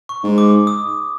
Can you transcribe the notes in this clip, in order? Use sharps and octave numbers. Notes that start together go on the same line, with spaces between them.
C#6
G#2
D6
D#6